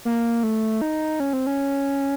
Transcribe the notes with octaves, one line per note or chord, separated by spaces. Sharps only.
A#3
A3
D#4
C#4
C4
C#4